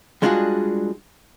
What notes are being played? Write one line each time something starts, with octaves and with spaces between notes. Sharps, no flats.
G3 G#3 D4 F4 F#4 G#4